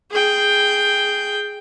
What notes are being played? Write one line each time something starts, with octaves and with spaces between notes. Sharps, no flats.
G#4 G5